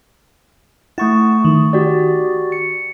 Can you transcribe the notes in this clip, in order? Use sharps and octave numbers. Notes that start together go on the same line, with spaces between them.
A3 E4 F#5 C#6 A6
D#3
F#4 G4 D5
C#7